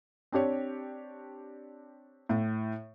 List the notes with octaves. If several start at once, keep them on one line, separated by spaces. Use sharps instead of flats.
C4 D4 G4 C#5
A2